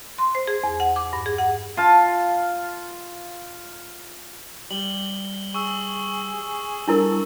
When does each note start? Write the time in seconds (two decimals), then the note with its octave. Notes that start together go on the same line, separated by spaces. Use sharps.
0.18 C6
0.35 C5
0.47 G#4
0.64 E2
0.80 F#5
0.96 D6
1.13 G2
1.26 G#4
1.38 F#5
1.77 F4 A5
4.71 G3 F#7 G7
5.54 G#4 C#6 E6
6.88 G2 D4 E4 A4 A#4